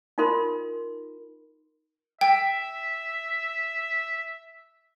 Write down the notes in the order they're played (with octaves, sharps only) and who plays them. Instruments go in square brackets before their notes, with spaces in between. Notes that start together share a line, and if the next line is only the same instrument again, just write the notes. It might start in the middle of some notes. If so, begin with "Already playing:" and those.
[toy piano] D#4 F4 A#4 C6
[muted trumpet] E5 [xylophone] G5